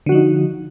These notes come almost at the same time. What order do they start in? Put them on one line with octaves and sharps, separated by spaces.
D3 F#4 F3 D#4